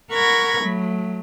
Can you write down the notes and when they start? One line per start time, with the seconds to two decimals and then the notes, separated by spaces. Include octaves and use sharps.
0.10 A#4 F#5 B5 C#6 G#6 A#6
0.61 F#3 A3